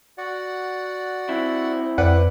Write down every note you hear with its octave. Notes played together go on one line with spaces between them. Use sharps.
F#4 D5 F#5
C4 E4
F2 B4 D5 F#5